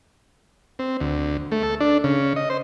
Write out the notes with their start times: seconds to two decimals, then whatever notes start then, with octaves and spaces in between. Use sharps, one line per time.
0.79 C4
1.01 D2
1.52 A3
1.63 A4
1.80 D4
2.04 C#3
2.36 D#5
2.50 C5